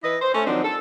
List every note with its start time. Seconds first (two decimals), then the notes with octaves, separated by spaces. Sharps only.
0.04 E3 E4 B4 D#5
0.22 C5
0.34 A3 C#4
0.46 D#3 F3 F#3 C4 D4 D#4
0.64 A4